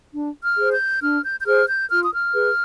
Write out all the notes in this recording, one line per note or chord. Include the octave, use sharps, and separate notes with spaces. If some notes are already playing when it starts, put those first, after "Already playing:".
D4
F6
G#4 C5
G6
D4 F6
G6
G6
G#4 C5 F6
G6
F4 F6
D#6
F6
G#4 B4